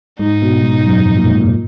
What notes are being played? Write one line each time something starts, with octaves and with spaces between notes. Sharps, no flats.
G#2 D#4
B2
G#2
F#2
F2
A#2
G#2
A#2